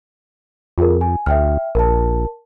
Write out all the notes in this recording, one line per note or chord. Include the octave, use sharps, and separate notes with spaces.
F2 F4 G#4 A#4
G#5
D2 E5 G5 F6
A#1 A#4 A5